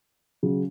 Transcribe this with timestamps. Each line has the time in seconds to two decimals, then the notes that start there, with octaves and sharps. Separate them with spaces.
0.43 C#3 F#3